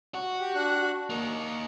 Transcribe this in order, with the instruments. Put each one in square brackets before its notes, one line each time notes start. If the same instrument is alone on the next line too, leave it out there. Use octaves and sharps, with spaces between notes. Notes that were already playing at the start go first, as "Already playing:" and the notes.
[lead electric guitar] F#4
[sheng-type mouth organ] G4
D4 F#5 F#6
[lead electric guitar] A#3 D#4 [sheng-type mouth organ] C#6